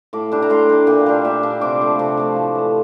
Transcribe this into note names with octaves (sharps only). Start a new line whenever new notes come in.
A2 D6
G3 D4
A#5
A2 C6
G3 D4
A#2 G5
G3 D4
A#2 E5
G3 D4
C3 D6
F3 A3
C3
F3 A3
A2
E3 G3